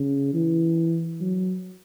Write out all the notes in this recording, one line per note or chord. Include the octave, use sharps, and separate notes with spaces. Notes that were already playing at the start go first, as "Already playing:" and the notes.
Already playing: C#3
E3
F#3